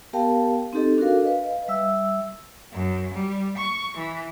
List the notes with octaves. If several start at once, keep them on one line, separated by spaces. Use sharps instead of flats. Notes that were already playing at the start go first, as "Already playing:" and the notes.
B3 G4 A#4 F5 G5 A5
C4 D#4 G4 A4 D#5
D4 F#4 A4 A#4 F5
B4 D#5 F5
G3 E5 E6
F#2
G3
C#6
E3